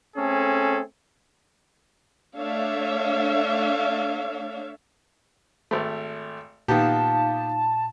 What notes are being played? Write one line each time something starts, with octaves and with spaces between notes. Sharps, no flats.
A3 C4 C#4 G#4 A4
A3 D4 C#5 E5 F5
G#1 A3
A#2 D#3 B3 D#4 G4 F5 A5